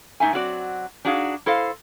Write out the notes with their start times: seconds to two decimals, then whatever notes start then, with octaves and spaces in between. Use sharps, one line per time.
0.20 G#2 A3 D#4 E5 G#5
0.33 F#3 C4 F#4 D5
1.05 D4 D#4 F#4 G#4 F5
1.46 E4 A4 C5 D#5 F5